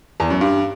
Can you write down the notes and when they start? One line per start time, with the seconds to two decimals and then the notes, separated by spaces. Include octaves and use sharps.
0.20 E2
0.30 F#2
0.41 G2